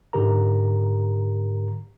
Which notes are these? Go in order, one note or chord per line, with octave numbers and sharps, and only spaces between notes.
G#2 D3 G4 A#4 A#5